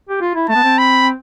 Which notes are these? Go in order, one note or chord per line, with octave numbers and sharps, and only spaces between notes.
G4
F4
E4
A3 A5
B3
C4
B5